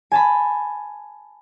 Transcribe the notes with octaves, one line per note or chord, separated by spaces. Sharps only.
G#5 A5 B5